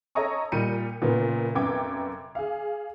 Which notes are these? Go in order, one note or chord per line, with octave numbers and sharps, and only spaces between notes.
A4 C#5 D#5 A#5 C#6 D#6
A#2 G3 G6 C#7 D#7
F#1 A#2 B3
F1 F#2 B3 G5 D6 G#6
G#4 F5